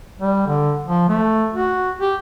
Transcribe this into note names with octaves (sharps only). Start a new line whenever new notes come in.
G3
D3
F3
A3
F#4
G4